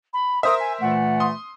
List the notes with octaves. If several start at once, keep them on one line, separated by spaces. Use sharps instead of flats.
B5
A#4 C5 E5 D#6
G#5
A#2 E3 A3 F#5
C6 D#6